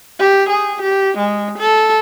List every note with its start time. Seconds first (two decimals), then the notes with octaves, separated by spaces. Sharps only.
0.19 G4
0.49 G#4
0.82 G4
1.17 G#3
1.58 A4